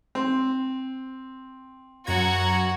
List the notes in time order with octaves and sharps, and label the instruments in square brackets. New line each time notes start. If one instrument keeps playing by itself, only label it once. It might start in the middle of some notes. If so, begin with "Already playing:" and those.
[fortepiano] C4
[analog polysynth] F#2 A#5 G#6 [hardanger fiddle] F#4 F#5